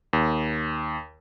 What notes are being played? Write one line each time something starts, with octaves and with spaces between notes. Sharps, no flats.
D#2